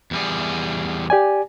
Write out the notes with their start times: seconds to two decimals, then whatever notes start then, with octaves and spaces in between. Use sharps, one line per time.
0.11 E2 G3 G#4
1.10 G4 D5 G#5